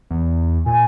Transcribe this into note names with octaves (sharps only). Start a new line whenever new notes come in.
E2
A#2 G#5